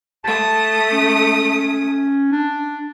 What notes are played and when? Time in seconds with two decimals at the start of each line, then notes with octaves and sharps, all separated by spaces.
0.25 A3 A5 D#6
0.92 C#4
2.32 D4